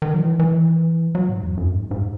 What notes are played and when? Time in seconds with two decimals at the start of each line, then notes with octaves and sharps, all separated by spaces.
0.02 D#3
0.14 F#3
0.20 E3
0.40 E3
1.15 F#3
1.29 G#2
1.43 E2
1.57 F#2
1.72 G#2
1.91 G#2